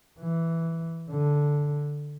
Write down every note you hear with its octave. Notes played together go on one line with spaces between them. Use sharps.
E3
D3